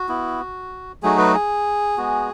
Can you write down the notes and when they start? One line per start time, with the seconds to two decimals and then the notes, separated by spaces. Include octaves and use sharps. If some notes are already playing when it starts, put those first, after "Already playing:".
Already playing: F#4
0.09 B3 E4
1.03 F#3 A3 D#4 F#4 G#4
1.18 B4
1.34 G#4
1.98 G#3 B3 F#4